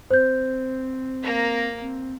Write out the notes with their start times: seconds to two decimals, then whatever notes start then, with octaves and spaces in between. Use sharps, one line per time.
0.10 C4 C5 G6
1.23 A#3 A#4
1.80 C4